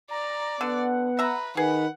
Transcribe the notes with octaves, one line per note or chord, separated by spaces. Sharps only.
D5 A#5
D3 B3 F#5
B4 E5 A#5
D#3 G#4 B4 F#5